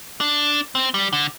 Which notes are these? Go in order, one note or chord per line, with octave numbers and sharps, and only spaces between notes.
D4
C4
G3
D3